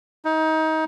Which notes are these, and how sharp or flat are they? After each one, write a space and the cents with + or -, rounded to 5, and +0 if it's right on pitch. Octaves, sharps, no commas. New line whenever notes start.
D#4 +25